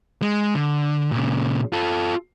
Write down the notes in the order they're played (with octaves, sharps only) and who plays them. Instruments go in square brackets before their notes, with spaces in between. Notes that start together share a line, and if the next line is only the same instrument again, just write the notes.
[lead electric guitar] G#3
D3
A#2 C#3
F4 A4